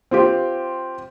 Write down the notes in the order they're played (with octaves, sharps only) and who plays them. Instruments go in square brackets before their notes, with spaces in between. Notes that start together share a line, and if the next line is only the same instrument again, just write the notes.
[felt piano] C4 F4 G4